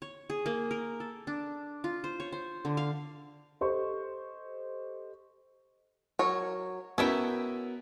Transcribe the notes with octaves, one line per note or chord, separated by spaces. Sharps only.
C#5
G#4
A#3
A#4
A4
D4
F4
C5
C#5
C5
D3
F5
G4 A4 C5 D#5 C#6
F#3 A#4 C#5
B3 C#4 E4 F#4 A4 A#4 E5 G5